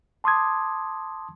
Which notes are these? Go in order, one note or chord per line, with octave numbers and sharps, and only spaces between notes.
A5 C6 D6 D#6 G#6